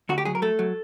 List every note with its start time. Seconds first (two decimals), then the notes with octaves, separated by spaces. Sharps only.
0.09 D2 F#4
0.18 G4
0.25 F#3 G#4
0.35 A#4
0.42 A3 A4
0.59 F#3